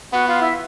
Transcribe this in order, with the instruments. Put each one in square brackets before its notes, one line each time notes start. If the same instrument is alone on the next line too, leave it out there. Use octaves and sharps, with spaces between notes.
[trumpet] B3 [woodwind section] F#4 F#5
[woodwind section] F4 F5
E4 E5